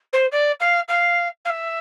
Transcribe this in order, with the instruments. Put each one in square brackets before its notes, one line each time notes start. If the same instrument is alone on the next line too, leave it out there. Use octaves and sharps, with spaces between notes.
[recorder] C5
D5
F5
F5
F5
E5